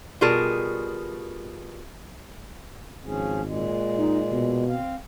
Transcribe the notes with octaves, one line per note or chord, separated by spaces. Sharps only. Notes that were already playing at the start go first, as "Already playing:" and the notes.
B2 G3 F4 G#4 A#4 A5
G#1 F3 C#4 G#4
A#2 G#3
D#4
B2
C4 F5